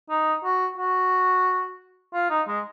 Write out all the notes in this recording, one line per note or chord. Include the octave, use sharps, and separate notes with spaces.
D#4
F#4
F#4
F4
D#4
G#3